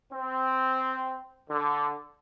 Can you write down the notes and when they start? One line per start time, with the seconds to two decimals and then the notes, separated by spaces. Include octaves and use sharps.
0.13 C4
1.50 D3